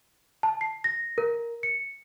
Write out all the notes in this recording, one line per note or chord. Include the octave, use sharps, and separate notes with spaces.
A5
C7
A#6
A#4
C#7